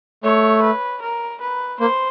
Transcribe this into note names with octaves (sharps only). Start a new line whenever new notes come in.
A3 C#5
B4
A#4
B4
A#3 C5